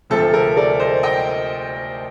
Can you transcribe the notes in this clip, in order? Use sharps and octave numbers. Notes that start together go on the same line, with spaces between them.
D2 C3 F3 A4
A#4
A#4 D5
C5 D#5
D#5 G5